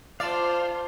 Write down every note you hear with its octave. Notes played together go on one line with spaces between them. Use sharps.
F4 C5 D5 F5 A5